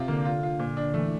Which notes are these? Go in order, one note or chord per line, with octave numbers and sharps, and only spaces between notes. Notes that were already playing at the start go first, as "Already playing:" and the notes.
Already playing: C3 F4
D3 A#3
F4
F4
A#2
D4
E3 A3